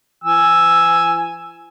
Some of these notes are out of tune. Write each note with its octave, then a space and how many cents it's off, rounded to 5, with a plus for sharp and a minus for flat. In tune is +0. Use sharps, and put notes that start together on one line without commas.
E3 +45 G#5 +0 E6 +0